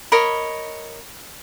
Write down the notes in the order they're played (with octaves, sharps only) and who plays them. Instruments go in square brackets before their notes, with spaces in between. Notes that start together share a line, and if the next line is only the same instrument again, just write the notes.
[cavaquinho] A#4 C#5 D#5 B5